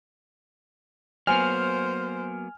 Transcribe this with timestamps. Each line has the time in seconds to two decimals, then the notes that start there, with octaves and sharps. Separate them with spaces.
1.27 F#3 A#3 B3 C5 G#5 F6